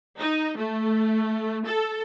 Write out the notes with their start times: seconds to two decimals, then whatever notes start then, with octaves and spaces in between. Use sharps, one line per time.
0.19 D#4
0.57 A3
1.66 A4